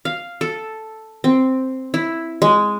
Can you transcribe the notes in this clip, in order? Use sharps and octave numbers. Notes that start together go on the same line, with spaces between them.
F5
A4
C4
E4
G#3